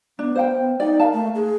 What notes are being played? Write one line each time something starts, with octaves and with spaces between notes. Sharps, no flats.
B3 D4
C5 F5 G5
D#4 D5 G5
A#4 F5 A5
A3
G#4